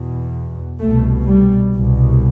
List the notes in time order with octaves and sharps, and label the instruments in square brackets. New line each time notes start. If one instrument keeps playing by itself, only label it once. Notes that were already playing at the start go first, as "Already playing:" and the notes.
Already playing: [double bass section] E2 B2
C2 B2 A3
G3
C2 B2